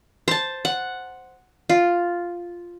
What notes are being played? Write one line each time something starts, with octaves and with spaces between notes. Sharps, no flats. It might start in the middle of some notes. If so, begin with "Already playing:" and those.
C5 A5
F#5
F4